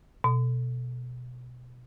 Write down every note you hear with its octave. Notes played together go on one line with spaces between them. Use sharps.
B2